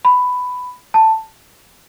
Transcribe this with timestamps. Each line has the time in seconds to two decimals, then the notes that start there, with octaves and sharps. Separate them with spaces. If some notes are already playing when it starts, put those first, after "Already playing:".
0.05 B5
0.94 A5